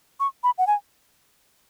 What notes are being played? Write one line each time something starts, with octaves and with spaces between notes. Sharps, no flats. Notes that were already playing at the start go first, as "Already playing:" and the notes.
C#6
B5
F#5
G#5